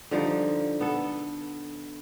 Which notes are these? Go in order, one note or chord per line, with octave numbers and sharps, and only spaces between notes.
D3 F3 G3 D#4
B3 A4